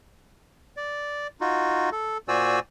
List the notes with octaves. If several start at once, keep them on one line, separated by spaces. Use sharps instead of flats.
D5
D#4 F4 F#4
A4
A#2 F#4 C5 D5 G#5 E6